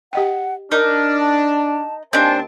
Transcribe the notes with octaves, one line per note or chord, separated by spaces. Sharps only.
G4 D#5 F#5 G5
D4 D#4 A#4 D#5 F6
A5
D#2 C4 D4 C5 D#5 G#5 A5